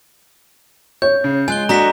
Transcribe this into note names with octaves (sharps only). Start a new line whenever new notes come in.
C#5 G6
C#3
G#3 F4 G#5 F#6 G7
A3 D4 F#4 D#5 A#5 B6 E7